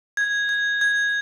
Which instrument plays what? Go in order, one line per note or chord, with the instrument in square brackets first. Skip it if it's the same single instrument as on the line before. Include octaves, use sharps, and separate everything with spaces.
[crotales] G#6
G#6
G#6